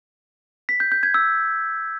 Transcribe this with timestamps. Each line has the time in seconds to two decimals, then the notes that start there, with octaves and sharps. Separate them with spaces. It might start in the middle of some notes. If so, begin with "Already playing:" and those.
0.69 B6
0.80 G6
0.92 G6
1.03 G#6
1.14 E6